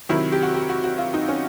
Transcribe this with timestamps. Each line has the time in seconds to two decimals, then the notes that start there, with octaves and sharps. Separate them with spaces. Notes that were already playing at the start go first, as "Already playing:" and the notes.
0.09 C3 D#3 F#3 E4
0.32 G4
0.43 F#4
0.54 G4
0.69 F#4
0.84 F#4
0.98 F4
1.14 D#4
1.29 C#4